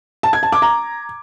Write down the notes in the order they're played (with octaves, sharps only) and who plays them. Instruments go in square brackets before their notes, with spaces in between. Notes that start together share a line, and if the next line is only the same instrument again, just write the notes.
[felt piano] A5
G#6
A5
D6
A#5